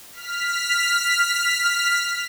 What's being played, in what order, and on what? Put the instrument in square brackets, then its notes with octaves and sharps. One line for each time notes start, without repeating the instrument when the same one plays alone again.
[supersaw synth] F6 B6